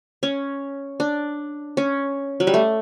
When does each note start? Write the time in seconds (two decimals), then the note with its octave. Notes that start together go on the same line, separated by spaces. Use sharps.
0.23 C#4
1.00 D4
1.77 C#4
2.40 F#3
2.47 G3
2.54 A3